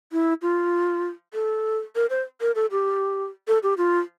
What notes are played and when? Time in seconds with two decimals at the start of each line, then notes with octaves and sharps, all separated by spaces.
0.12 E4
0.42 F4
1.34 A4
1.95 A#4
2.10 C5
2.41 A#4
2.55 A4
2.71 G4
3.48 A4
3.63 G4
3.78 F4